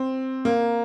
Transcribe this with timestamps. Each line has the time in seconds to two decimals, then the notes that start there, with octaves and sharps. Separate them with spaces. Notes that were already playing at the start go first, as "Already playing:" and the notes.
Already playing: C4
0.45 A#3